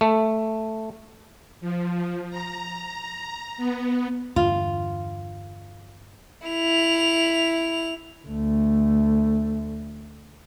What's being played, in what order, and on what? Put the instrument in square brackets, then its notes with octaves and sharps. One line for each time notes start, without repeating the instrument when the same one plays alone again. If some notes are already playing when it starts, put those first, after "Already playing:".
[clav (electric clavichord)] A3
[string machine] F3
A#5
B3
[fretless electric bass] E2 G2 D3 [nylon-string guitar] F4
[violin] E4 F7
[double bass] D2 A3